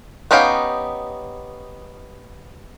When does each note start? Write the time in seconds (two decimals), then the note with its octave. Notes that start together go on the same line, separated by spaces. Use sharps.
0.31 B3 C#4 D#4 G4 F5